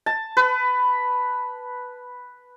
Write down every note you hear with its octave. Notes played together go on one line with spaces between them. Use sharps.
A5
B4